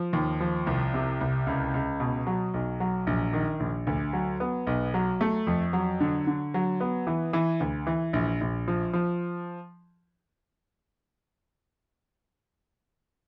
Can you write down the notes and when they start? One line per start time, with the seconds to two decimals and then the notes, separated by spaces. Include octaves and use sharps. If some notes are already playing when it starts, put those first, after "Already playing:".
Already playing: F3
0.13 D#2
0.40 F3
0.67 C2
0.94 C3
1.21 C2
1.47 C#2
1.74 C#2
2.00 B2
2.27 F#3
2.54 B1
2.80 F#3
3.07 A#1
3.33 D#3
3.60 A#1
3.87 D2
4.13 F#3
4.40 B3
4.67 B1
4.94 F#3
5.21 A3
5.47 F2
5.73 F#3
6.00 D3
6.27 D3
6.54 F#3
6.80 B3
7.07 E3
7.33 E3
7.60 D2
7.87 E3
8.13 A#1
8.41 A#1
8.68 F3
8.93 F3